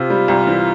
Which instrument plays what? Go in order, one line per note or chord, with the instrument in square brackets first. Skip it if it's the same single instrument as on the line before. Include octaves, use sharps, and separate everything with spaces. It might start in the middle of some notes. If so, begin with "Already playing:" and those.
Already playing: [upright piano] C3 [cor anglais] F4
[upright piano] G3
C2
E3